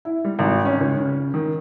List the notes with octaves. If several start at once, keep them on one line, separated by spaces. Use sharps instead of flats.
E4
G3
G#1
C#4
C#2
C#3
D#3